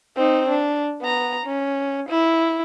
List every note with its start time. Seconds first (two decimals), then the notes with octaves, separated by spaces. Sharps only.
0.16 C4 D#4
0.49 D4
1.01 B3 A#5
1.46 C#4
2.09 E4